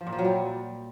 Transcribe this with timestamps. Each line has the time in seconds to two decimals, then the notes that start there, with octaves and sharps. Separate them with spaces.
0.01 F3
0.07 A#2
0.13 F3
0.19 F#3
0.24 G3